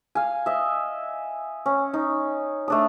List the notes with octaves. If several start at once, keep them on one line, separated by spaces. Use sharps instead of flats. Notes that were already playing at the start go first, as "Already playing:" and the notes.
F5 G#5
D#5 E5
C#4
D#4
A3 D4 D#6